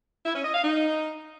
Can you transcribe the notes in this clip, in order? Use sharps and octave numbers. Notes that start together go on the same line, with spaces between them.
E4
C#4
D#5
F5
D#4